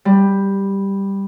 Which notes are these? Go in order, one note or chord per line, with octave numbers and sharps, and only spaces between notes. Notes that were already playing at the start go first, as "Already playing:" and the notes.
G3